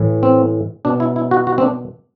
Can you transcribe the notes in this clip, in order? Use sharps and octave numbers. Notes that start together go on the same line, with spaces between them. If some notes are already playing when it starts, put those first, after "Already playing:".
Already playing: A2 E3
C4
B2 D4
E4
E4
F#4
F#4
C4
D4